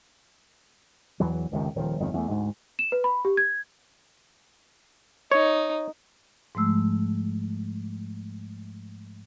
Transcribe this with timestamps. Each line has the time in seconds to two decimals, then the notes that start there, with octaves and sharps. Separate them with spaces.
1.20 E2 E3 F#3
1.51 F1 C#2 C3 D#3
1.75 D#1 D#3 F3
2.00 G1 F2 D#3
2.14 E2 A3
2.27 D2 G#2
2.79 E7
2.92 B4
3.04 B5
3.25 G4
3.37 G#6
5.32 D#4 C#5
6.55 G#2 F3 G#3 A3 E6